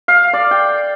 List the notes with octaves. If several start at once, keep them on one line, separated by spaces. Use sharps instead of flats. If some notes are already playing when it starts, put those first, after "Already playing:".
F5
D5
G5